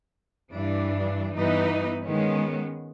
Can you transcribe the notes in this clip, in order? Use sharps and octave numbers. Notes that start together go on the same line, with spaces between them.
G2 E3 D4
G2 E3 B3 D#4 B4
D#3 G#3 B3 C#4